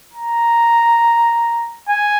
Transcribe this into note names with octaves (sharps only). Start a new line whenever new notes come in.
A#5
G#5